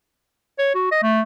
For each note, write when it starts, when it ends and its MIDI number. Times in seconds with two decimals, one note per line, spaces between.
0.59 0.74 73
0.75 0.88 66
0.92 0.99 75
1.03 1.21 57